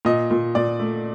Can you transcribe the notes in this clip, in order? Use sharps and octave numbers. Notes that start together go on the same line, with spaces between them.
A#2 D#5
A#2
A#2 D5
A3